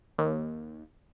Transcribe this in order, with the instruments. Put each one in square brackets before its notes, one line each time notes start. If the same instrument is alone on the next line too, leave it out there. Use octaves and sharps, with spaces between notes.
[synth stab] D#2